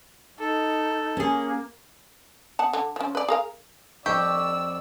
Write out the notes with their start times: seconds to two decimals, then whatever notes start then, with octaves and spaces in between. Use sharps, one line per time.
0.39 D#4 A4
1.17 A#3 C#4 G#4
2.59 B3 F#5 A5
2.73 D3
2.96 F3 C#4
3.15 B4 D5
3.28 G#4 A#4 F5
4.06 F2 G4 D5 C#6 E6